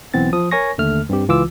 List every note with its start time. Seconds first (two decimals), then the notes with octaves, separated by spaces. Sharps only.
0.14 B1 E3 B3 C4 A6
0.33 F3 D#6
0.51 A#4 C#5 G#5 C#6 A#6
0.78 D#2 D3 A3 F6
1.09 G2 C4 G4
1.28 C#2 E3 F4 D6 E6